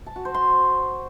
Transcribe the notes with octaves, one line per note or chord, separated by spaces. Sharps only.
A5
F#4
C5
C6